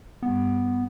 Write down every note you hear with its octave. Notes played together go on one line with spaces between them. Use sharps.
G2 B3